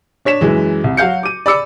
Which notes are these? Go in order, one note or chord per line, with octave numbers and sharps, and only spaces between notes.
D4 C#5 B6 E7
F#2 E3 G#3
C2
F#3 F#4 F5 G6 C#7
D6 D#7
D5 B5 D6 E6 C#7